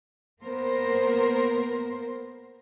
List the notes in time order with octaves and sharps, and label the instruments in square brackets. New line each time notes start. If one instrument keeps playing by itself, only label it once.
[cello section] A#3 B3 A#4 C5